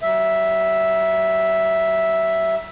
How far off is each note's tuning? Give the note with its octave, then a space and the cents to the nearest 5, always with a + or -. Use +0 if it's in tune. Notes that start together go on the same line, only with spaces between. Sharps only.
G3 -45 E5 +0